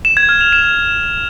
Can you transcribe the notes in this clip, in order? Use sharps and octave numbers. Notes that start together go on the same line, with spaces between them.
E7
G#6
F6
F7
E7